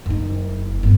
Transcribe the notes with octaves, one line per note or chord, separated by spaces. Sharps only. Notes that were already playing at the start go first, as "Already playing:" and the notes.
F#1 D#4
G1 F#2